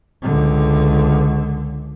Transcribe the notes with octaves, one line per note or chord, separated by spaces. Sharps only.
C#2 D3